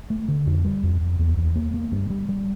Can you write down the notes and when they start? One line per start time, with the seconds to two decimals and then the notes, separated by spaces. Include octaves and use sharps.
0.10 A3
0.28 D3
0.46 F2
0.65 G3
0.83 F2
1.01 F2
1.19 E2
1.37 E2
1.56 A#3
1.74 A#3
1.92 G2
2.10 G3
2.29 G3